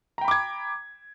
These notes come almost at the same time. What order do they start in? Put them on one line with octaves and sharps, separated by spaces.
A#5 G5 B5 D6 G#6